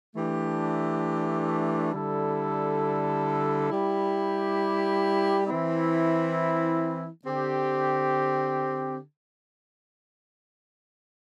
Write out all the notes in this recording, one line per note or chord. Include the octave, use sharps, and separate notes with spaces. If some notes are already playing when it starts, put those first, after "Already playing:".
E3 A3 D4 G4
D3 G3 E4 A4
G3 E4 G4
E3 C4 E4
D3 C4 G4